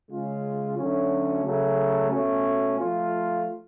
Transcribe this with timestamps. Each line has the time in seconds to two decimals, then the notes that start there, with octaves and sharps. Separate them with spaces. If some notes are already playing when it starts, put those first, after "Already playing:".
0.10 C#3 G#3 C#4 F4
0.77 D3 F#3 A3 C#4
1.44 C#3 F#3 A3
2.11 B2 A3 C#4
2.79 F3 A3 F4